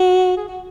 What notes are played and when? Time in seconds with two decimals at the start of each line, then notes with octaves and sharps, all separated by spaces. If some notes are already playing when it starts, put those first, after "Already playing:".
Already playing: F#4
0.37 G#4
0.48 F#4